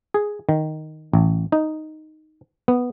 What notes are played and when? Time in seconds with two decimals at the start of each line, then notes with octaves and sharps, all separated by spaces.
0.14 G#4
0.49 D#3
1.13 A1
1.52 D#4
2.68 B3